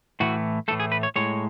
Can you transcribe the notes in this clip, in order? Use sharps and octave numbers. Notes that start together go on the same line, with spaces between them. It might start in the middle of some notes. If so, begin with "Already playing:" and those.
A2 E3 A3 F#4
A2 E3 A3 A4
G#4
B4
C#5
A2 G#3 C#5